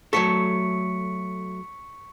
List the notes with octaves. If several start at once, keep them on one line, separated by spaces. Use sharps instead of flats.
F#3 A3 A4 C#6 B6 C#7